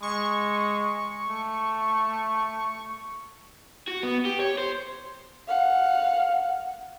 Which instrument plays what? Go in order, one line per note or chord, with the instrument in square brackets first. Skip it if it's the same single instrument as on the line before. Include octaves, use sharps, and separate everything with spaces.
[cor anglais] G#3 [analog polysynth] C#6
[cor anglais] A3
[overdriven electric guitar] F#4
B3
G4
C#5
C5
[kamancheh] F5 F#5